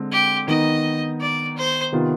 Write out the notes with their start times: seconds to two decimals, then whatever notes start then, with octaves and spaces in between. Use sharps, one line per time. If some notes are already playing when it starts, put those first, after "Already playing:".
Already playing: D3 G#3 C4
0.12 G4
0.48 D#3 B3 D#4 D#5
1.21 D5
1.57 C5
1.92 C3 D#3 B3 F4